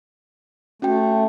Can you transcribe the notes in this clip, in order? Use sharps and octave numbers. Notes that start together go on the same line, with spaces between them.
A3 C#4 F#4 G5